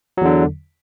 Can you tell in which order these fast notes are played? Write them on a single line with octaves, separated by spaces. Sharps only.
F#3 E2 D3